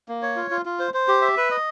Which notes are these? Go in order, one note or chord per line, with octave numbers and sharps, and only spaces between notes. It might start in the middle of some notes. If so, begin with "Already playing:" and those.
A#3
C#5
F4
F4
F4
C5
C5
G4
E5
B4
D#5